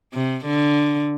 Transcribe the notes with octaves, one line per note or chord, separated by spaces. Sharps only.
C3
D3